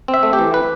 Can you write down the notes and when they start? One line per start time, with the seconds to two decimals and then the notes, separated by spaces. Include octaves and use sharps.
0.08 C4
0.14 E5
0.23 A3
0.33 G4
0.39 E3
0.54 B4